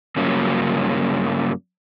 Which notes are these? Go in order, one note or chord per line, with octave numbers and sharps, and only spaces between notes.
G2 C#3 F#3 A#3 C#4 F4